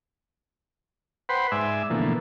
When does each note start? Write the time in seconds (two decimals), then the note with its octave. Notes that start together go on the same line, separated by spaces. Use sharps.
1.29 B4 C5 F#5 G5 B5 C6
1.52 G#2 D5 E5 G#5 E6
1.90 B2 D3 E3 F3 A3 A#3